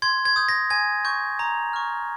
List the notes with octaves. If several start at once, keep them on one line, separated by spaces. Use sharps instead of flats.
C6 G#6
G#6
D#6 G6
A#6
G#5 G#6
C#6 G6
A#5
C#6 F6